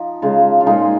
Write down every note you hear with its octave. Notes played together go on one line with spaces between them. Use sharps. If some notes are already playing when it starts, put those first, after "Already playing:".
Already playing: F3 D#4
C#3 G#3 F4
F4
A#2 G#3 D#4